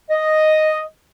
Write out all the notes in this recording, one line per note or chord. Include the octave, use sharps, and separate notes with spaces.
D#5